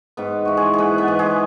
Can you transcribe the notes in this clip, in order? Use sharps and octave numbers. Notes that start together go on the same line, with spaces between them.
G#2 B3 B4
E3 F#4
G#3 G#4
G#2 B3 G#4 B4
B3 B4
E3
G#3 G#4